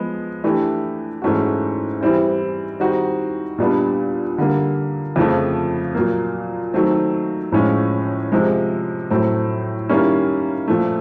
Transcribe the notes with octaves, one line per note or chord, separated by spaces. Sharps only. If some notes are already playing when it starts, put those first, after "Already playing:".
Already playing: F3 G#3 B3
E3 A3 D4 G4
G#2 E3 A3 C#4 F#4
E3 G3 C4 E4
D#3 G3 C4 D#4 F#4
A#2 G3 B3 D4
D3 G3 A#3
F2 C#3 F3 A3
A#2 F#3 A#3
D#3 F#3 A3 C4
A2 F3 G#3 C#4
C3 F3 G#3
A2 F#3 A3 C4
D#3 G3 A#3 C#4 E4
A#2 F3 A3